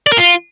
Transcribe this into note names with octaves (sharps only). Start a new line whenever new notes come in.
D5
A#4
F4